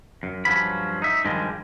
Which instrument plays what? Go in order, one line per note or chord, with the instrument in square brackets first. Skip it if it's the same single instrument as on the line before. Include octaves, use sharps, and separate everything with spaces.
[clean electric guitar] F#2
G2 F3 F#3 C#4 B5
D#4 E5
G2 D#3 F3 G3 G#3